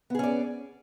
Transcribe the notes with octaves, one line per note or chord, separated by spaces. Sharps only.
B3 C#4 G#4 D5